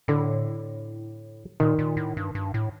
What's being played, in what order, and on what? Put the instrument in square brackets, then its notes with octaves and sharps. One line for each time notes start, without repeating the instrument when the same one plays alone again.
[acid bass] A2 [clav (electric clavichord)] D3
[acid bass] A#2 [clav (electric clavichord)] D#3
[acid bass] A#2
A2
G2
G2
A2